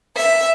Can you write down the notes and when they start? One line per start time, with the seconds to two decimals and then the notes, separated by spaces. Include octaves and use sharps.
0.16 E5